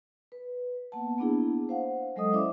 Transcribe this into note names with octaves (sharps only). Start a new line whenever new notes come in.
B4
A#3 B3 F#5 A5
A#3 B3 D4 E4 G#4
C5 F5 F#5
F#3 G#3 A4 D#5 D#6
C#4 E4 C5 D5 E5 D6